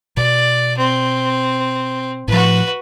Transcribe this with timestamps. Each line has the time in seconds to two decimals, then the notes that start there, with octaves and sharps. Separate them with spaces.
0.17 B2 D5
0.78 C4
2.28 A2 F3 F#4 B4